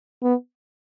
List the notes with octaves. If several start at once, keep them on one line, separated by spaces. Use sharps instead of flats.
B3